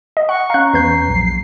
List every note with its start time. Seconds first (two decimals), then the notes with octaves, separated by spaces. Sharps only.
0.17 D#5
0.29 F#5 C#6 F#6
0.50 C#4 F5 A#5 F#6
0.74 E2 B4 G6 C7
1.09 A#1 F#3